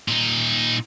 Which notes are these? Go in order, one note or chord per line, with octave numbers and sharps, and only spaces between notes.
A#2 D#4